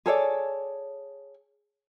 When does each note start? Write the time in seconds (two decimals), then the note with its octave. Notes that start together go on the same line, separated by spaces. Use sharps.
0.06 G#4 A4 C#5 D5